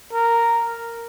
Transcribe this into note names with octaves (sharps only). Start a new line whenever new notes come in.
A#4